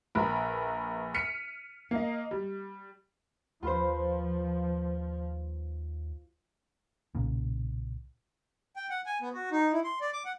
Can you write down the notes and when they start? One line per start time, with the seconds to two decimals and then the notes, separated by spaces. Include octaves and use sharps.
0.15 A#1 A#4 B4 B5
1.14 F6 B6 C#7 D#7
1.91 A#3 D#5
2.31 G3
3.63 D#2 F3 F4 B4 C5
7.15 B1 A#2 C#3
8.76 G5
8.90 F#5
9.06 G#5
9.21 B3
9.33 F#4
9.52 D#4
9.73 E4
9.84 C6
10.01 D5
10.13 D6
10.25 F#5